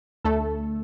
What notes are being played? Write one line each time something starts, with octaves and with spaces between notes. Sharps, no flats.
D2 D3 A3 A4